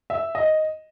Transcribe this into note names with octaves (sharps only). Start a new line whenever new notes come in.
E5
D#5